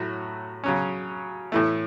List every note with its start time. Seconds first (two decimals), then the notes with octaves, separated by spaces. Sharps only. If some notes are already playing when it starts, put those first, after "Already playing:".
Already playing: A2 F#3 A3 F#4
0.64 C#3 F#3 C#4
1.52 A2 E3 A3